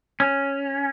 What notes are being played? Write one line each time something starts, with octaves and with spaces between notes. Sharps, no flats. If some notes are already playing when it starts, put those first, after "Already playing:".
C#4